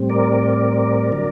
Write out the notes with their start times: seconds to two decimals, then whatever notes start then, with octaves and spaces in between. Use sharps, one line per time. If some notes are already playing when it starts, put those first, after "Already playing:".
Already playing: A2 G3 C4
0.10 A#4 D5
1.12 D3 F#3